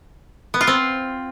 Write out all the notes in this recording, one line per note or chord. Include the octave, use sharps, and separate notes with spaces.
B3
F4
C4